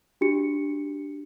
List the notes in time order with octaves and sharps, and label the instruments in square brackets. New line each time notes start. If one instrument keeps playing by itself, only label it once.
[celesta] D4 F#4 G4 C#7